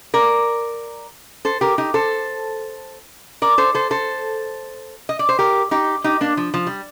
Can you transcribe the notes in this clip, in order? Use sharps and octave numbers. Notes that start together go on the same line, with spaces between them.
A#4 D5
A4 C5
G4 A#4
D#4 G4
A4 C5
A#4 D5
A4 C5
A4 C5
A4 C5
D#5
D5
C5
G4 A#4
D#4 G4
D#4 G4
A#3 D4
F3
F3
G3